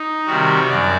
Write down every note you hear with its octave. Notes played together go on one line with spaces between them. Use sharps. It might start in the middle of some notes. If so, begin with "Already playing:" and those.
Already playing: D#4
C3 D#3 G3 F#4
F#2 D5